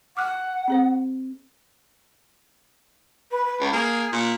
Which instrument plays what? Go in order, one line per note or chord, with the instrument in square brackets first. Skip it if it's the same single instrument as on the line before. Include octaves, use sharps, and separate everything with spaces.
[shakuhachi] F#5 [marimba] D6 F6 F#6
[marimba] C4 G#4 C5
[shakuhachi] B4
B4
[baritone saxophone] C#2
[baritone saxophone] A#3 [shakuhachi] G#4
[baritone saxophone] A#2